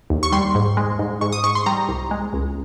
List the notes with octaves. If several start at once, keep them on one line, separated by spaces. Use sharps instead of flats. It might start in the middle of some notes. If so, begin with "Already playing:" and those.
D#2
C#6
G3 C6
G#2
G#3
G#2
G#2 C#6
D#6
G#2 C#6
C6
G3 A#5
C2
G#3
C#2